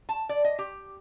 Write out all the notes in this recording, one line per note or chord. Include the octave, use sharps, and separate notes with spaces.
A5
D5
D#5
G4